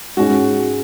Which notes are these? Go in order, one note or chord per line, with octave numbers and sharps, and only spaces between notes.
G#2 G#3 C#4 F#4 G#4